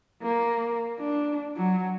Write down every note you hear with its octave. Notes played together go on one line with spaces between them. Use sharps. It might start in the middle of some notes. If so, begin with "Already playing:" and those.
A#3
D4
F#3